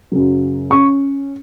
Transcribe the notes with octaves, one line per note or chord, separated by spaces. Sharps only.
F#2 C#3 F#3
C#4 C#6